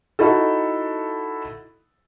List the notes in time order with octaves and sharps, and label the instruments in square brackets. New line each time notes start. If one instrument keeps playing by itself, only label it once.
[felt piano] D#4 E4 F#4 A4